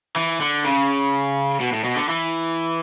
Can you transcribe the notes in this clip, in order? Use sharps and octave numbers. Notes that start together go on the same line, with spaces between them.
E3
D3
C#3
B2
A2
B2
D3
E3